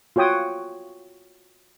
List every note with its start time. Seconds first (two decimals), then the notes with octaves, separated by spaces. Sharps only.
0.16 F4 F#4 C#5 G5 D#6